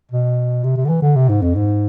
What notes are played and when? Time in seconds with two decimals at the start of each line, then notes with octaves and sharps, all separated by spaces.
0.12 B2
0.64 C3
0.77 C3
0.85 D3
0.89 E3
1.02 D3
1.16 C3
1.29 G#2
1.42 F2
1.55 G#2